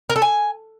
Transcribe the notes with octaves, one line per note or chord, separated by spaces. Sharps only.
A#4
A4
G#5